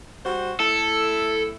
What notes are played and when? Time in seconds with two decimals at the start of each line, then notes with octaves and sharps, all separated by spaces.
0.25 G3 F#4 C5
0.60 A3 E4 A4